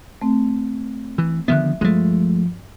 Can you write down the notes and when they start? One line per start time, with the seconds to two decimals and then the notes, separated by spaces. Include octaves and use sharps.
0.21 A3 C4
1.18 E3
1.48 D3 D#3 F3 B3 E5 F#6
1.81 G2 F3 G#3 A3